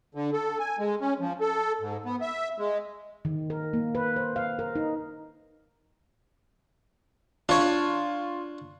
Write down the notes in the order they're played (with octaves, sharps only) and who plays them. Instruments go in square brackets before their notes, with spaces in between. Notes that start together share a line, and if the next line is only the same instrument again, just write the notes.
[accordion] D3
A4
G#5
G#3
C#4
F3
A4
G#2
B3
E5
G#3
[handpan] D#3
A#4
A#3
B4
C5
F5
A#4
D#4
[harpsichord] D4 C#5 [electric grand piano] F4